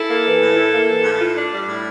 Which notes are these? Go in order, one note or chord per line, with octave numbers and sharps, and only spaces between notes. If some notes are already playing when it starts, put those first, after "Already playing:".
Already playing: E4 A4
A#3
E3
A2
E4
A#3
E3
A2
F4
D4
G3
A2